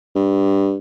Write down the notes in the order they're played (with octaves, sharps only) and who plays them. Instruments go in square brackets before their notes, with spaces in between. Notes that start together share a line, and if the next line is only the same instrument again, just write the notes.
[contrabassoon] G2